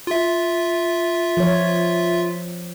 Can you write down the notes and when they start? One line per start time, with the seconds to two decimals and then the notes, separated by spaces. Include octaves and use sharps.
0.07 F4 E5
1.37 F3 C#5